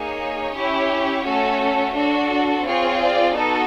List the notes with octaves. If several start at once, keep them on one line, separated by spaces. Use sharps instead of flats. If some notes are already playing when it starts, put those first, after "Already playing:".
Already playing: A#3 D#4 G#4 C#5
C#4 E4 G4
A3 C#4 F#4 A4
D4 F#4 A4
C4 F4 G#4 C#5
D5
B3 D#4 F#4 A4